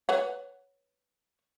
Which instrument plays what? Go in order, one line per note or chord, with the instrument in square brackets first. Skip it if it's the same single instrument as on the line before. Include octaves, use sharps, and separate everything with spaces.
[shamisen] B4 C#5 F#5